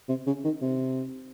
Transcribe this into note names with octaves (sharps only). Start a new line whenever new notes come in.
C3
C#3
D#3
C3